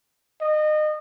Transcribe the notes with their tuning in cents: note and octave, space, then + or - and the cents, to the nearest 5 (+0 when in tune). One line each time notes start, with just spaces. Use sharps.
D#5 -30